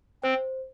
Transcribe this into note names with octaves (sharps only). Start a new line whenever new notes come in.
C4 C5